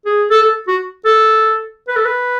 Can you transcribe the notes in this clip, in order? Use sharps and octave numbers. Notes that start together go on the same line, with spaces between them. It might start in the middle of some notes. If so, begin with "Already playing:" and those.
G#4
A4
A4
F#4
A4
B4
A4
B4